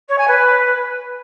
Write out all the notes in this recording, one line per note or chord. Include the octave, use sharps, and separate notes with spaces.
C#5
G#5
B4